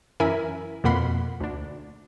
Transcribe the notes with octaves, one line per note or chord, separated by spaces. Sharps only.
F#2 E3 E4 A#4 G#5 B5
F2 B2 A#3 F#5 B5 C6
D2 D4